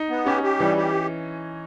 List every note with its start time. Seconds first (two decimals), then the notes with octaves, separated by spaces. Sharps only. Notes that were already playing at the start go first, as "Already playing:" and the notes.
Already playing: D#4
0.10 B3
0.26 C#4 G4
0.43 G4
0.60 E3 G3
0.77 G4